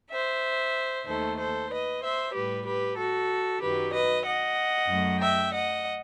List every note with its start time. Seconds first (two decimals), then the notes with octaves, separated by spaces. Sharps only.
0.11 C5 E5
1.06 D#2 D#3 A3 A4 C5
1.39 A4 C5
1.71 B4 D#5
2.02 C5 E5
2.34 A2 G3 G4 B4
2.66 G4 B4
2.97 F#4 A4
3.61 F#2 D#3 F#3 G4 B4
3.93 B4 D#5
4.25 D#5 F#5
4.88 F#2 F#3 A3
5.21 E5 G5
5.53 D#5 F#5